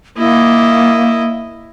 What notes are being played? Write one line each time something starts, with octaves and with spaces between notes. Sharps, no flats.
A#3 E4 D#5